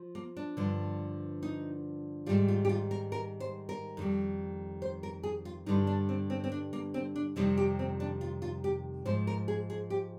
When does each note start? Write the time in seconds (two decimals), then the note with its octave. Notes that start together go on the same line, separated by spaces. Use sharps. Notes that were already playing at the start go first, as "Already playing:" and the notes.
Already playing: F3
0.15 A#3
0.37 D4
0.57 G2 D3 F3
1.43 D#4
2.26 G#2 D#3 G3 F4
2.48 F4
2.65 G4
2.69 F4
2.91 A#4
3.12 A#4
3.40 C5
3.69 A#4
3.97 F2 D#3 G3
4.82 C5
5.03 A#4
5.23 G#4
5.45 F4
5.66 G2 D3 G3 D#4
5.87 D4
6.09 C4
6.30 C4
6.44 C4
6.52 D4
6.73 A#3
6.94 C4
7.16 D4
7.36 F2 C3 D#3 G3 D#4
7.57 G4
7.79 C4
8.00 D4
8.21 F4
8.42 F4
8.64 G4
9.05 G#2 F3 C5
9.27 A#4
9.48 G#4
9.70 G#4
9.90 G4